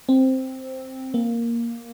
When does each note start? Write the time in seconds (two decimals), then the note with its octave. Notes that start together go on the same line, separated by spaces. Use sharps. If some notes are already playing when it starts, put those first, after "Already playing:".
0.09 C4
1.14 A#3